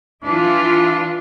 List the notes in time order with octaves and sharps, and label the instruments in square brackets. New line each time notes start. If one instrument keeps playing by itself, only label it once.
[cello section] E3 F4 [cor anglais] D4